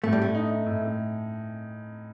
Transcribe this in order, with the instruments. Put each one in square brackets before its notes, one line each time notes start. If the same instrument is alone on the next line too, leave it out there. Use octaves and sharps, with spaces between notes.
[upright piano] A2 [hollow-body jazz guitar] A3
[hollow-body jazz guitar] G3
[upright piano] A2 [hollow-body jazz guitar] A3
[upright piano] D#4
D#4
A2
A2